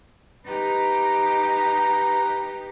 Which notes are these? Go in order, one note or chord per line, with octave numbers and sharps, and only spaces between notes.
D#4 G4 B4 A#5